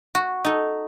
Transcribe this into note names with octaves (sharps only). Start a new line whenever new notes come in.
F#4
D#4 A4